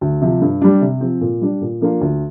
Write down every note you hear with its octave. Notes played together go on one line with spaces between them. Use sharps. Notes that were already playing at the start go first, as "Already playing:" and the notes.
D2
C3 F3
G2
G3 D4
C3
F3 C4
A#2
G3 D4
A#2
F3 A#3 D4 F4
D2